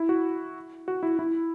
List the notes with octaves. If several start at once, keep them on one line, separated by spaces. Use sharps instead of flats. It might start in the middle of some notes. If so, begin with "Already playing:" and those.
Already playing: E4
F#4
F#4
E4
E4